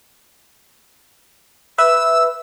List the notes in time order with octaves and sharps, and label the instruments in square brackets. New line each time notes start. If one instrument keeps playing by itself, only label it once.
[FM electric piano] B4 E5 [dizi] E6